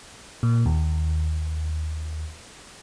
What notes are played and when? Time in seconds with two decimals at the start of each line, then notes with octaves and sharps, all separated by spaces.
0.43 A#2
0.66 D#2